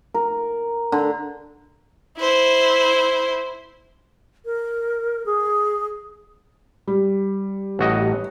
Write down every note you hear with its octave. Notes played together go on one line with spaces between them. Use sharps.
A#4
D3
E4 C5
A#4
G#4
G3
A1 F#4 D#5